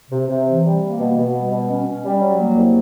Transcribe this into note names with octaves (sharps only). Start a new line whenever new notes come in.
C3
C3
E3
G3
A#3
B2
B2
G3
B2
C#4
C#4
G3
F#3
A#3
C2